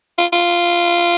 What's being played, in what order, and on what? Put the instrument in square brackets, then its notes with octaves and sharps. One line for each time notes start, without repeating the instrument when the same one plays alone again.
[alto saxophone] F4
F4